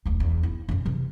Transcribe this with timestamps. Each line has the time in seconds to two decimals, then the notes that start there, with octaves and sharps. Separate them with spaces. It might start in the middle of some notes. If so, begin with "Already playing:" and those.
0.05 E1 D2
0.20 E2
0.43 E4
0.69 F#2 C#4
0.86 C3 E3